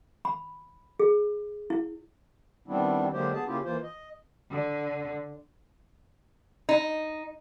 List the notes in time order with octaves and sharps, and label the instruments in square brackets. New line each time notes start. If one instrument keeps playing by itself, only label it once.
[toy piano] B5
G#4
E4
[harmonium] D#3 G3 B3 C4 D4 E4
D3 F#3 G#3 A#3 G4 C5
B3 G#4 A5
C#3 A#3 C#4 E4 F4 G4
E3 A#3 F4 C5
D#5
[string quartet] D3
[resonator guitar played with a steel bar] D#4